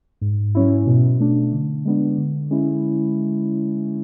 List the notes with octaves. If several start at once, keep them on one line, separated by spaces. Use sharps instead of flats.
G#2
F#3 C#4 E4
B2
A3 D4
D3
G#3 B3 D4
D3
G#3 C#4 E4